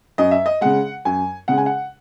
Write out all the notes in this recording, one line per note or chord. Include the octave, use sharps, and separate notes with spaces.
F#2 D#5
E5
D#5
C#3 G#3 F#5
F#2 G#5
C#3 G#3 F#5
G#5
F#5